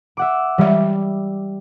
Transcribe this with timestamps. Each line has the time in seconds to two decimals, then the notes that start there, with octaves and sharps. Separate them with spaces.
0.17 E5 F#5 D6
0.58 E3 G3 G#3 E5